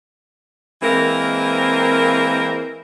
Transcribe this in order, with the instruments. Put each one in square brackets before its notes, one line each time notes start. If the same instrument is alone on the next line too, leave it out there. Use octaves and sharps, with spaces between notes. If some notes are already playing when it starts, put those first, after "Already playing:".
[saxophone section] E3 G#3 A#3 C4 A#4